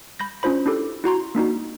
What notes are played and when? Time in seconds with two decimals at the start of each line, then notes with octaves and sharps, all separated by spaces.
0.20 B5 G6 A#6
0.43 C#4 D4 F4 C5 B5
0.66 D4 E4 G4 A4
1.04 E4 F#4 A#5 C6
1.35 A#3 D4 D#4 F#4